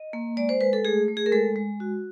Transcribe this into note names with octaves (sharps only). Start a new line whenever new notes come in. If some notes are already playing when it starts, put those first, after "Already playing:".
Already playing: D#5
A#3
G#3 D5
C5
G#3 B4
A4
A3 G#4
A3
G#4
A#4
G#3 A4
G#3
F#4